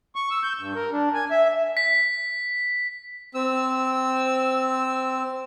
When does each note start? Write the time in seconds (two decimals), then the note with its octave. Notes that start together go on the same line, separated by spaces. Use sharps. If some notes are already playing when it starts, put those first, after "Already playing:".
0.16 C#6
0.31 E6
0.43 G6
0.59 G2
0.75 A#4
0.92 D4
1.14 G#5
1.31 E5
1.77 B6
3.34 C4 E6